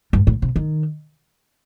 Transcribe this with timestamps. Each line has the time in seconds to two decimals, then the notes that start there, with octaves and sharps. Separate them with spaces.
0.13 G2
0.27 A2
0.42 C3
0.56 D#3